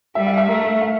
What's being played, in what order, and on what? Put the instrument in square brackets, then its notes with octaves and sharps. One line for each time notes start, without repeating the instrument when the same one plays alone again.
[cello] G3 [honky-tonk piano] E5
[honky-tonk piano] F5
E5
[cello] A3 [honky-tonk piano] A#4
[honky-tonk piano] A4
F5